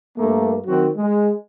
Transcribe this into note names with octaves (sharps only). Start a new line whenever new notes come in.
G2 A3 A#3
D#3 F#3 C4 F#4
G#3